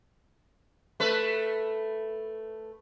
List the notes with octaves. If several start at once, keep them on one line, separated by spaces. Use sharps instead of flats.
A3 B4